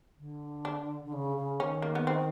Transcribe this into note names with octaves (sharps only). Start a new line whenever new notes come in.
D3
D4
D3
C#3
C#3
D#3 C#4
A#3
B3
C4